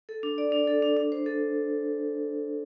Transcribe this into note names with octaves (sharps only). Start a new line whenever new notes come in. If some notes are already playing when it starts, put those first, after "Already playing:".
A4
D4
D5
D4
A4
D4
D4
C5
A4